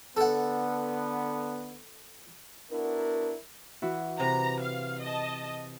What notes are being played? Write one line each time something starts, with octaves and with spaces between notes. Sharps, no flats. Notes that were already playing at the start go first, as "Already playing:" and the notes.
D3 B3 A4 F#5
B3 D4 E4 F#4 A#4
E3 E4 F#4
C3 B4 A#5
F5
D#5 A5